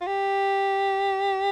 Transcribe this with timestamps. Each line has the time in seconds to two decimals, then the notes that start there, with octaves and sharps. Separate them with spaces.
0.01 F4
0.07 G4